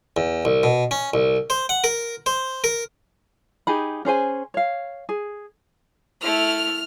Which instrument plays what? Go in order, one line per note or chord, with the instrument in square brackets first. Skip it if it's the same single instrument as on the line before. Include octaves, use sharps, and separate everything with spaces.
[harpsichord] E2
C2
B2
C#4
C2
C5
F#5
A#4
C5
A#4
[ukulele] D#4 G4 G#4 B5
C#4 G#4 C5 G#5
C#5 F5
G#4
[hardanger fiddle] A3 E4 [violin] F6 F7